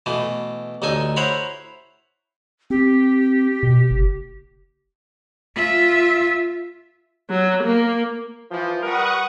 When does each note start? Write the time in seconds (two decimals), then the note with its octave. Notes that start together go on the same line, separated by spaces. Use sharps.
0.06 B2 E3 A3
0.82 A1 D2 D#4 A4 G#5
1.16 E4 C5 C#5 F#5 A#5 B5
2.70 C4 G4
3.63 B2
3.90 F#1
5.55 F4 E5
7.30 F#3
7.63 A#3
8.52 E3 F3
8.83 G3 A#4 B4 F#5 C#6 D#6